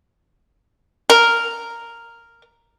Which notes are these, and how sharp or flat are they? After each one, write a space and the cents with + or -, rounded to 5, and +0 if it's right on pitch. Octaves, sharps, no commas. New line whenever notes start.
A#4 -5